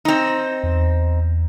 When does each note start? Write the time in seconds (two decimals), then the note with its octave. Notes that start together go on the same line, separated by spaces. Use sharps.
0.05 C4 D#4
0.63 E2